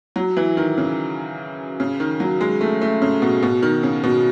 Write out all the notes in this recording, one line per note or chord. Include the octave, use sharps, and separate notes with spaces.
F#3
E3
D#3
C#3
C#3
D#3
F#3
G#3
A3
A3
C#3
B2
B2
D#3
C#3
B2